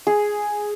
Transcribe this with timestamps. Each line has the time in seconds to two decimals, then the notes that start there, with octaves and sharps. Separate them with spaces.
0.07 G#4